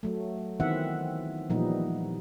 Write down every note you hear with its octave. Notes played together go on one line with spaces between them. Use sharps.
F#3 A3
D#3 E3 B3 C4 E5 F#5
A#2 E3 F3 G3 B3 D#4